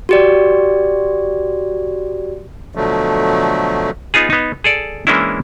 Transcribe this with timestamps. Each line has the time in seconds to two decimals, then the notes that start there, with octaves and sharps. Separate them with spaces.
0.09 F#4 G4 D5
2.75 B2 D3 F3 F#3 A3
4.14 B3 D#4 F4 G#4
4.30 B3 D#4
4.64 G#4 A4 D5
5.07 E3 G#3 A#3 C#4 D4 E4